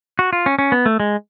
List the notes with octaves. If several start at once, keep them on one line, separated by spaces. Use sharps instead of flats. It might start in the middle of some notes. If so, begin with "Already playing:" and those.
F#4
F4
C#4
C#4
B3
A3
G#3